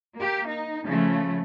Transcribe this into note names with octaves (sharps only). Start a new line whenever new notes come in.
A#3 G4
D#4
C#3 F3 A3